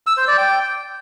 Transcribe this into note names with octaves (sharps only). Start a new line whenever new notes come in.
E6
C5
D5
G5